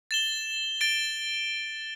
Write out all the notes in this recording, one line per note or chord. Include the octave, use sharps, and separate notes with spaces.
A6 E7 G7
A6 D7 G7